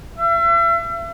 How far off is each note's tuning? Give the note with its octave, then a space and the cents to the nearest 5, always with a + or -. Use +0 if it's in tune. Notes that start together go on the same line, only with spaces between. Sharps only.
E5 +40